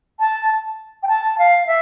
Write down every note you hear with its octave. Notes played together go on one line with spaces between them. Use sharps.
A5
G5
A5
F5
E5